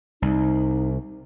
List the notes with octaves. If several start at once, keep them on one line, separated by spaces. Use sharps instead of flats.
C2 D#4